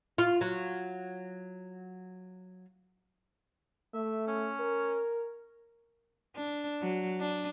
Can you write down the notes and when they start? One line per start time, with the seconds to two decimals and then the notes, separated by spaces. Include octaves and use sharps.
0.18 F4
0.41 F#3
3.94 A3 E5
4.28 C#4
4.60 A#4
6.36 D4
6.82 F#3
7.20 D4